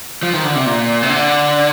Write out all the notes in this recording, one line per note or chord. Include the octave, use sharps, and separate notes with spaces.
F3
D#3
D3
C3
A#2
C3
D3